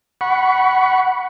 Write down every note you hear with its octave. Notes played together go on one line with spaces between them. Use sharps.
F#5 B5 C#6